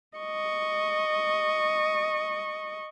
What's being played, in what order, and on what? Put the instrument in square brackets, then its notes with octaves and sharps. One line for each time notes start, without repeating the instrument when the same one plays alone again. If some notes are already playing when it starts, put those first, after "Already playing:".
[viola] D#5 C#6